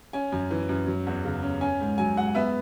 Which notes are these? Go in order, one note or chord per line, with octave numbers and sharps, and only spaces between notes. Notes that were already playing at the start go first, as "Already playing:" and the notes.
C#4 G#5
F#2
E3
F#2
F#3
E2
C#3
C#4
C#4 G#5
G#2
F#3 G#5
G#2 F#5
B3 E5